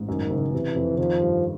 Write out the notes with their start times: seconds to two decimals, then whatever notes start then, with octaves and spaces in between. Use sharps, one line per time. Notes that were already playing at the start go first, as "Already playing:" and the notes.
Already playing: A1 G#2
0.08 F#2 D#3
0.30 F#1
0.52 C3 E3
0.76 F2
0.98 D#3 F3
1.20 G2